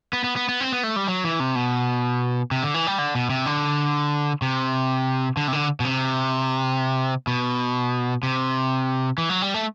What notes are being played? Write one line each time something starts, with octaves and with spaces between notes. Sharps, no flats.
B3
B3
B3
B3
C4
B3
A3
G3
F#3
E3
C3
B2
C3
D3
E3
G3
D3
B2
C3
D3
C3
D3
C3
D3
B2
C3
B2
C3
E3
F#3
G3
A3